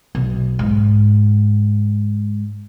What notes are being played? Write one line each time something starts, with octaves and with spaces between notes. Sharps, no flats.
B1
G#2